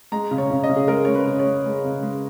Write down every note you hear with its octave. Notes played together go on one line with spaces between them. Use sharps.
G#3 A#5
C#3
C#5
C#3
D#5
C#3
G#4
G#3 A#4
G#3 C#5
B4
C#3
C#5
G#3
G#3
C#3
G#3